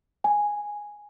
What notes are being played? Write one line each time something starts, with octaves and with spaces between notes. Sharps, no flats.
G#5